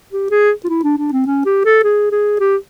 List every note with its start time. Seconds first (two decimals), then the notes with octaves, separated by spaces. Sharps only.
0.13 G4
0.31 G#4
0.64 F4
0.69 E4
0.84 D4
0.98 D4
1.12 C4
1.26 C#4
1.46 G4
1.65 A4
1.84 G#4
2.11 G#4
2.40 G4